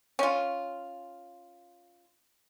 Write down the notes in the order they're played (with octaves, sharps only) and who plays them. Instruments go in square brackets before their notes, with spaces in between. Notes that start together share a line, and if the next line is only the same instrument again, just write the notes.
[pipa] C#4 F4